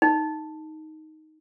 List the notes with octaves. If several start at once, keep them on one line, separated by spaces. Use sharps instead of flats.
D#4